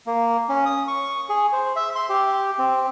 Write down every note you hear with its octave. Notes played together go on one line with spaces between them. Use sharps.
A#3
C#4
D#6
C#6
G#4
C5
E5
C6
G4
C4